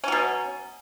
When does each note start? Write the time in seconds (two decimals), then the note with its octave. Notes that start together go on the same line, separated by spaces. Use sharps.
0.04 C#4
0.08 F#3
0.12 B2